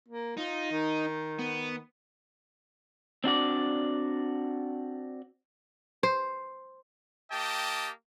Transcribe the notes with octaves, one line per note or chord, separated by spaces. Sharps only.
A#3
D#4 F4
D#3
B3
C4 D4 F#4 D5
C5
A#3 G4 D#5 G5 A5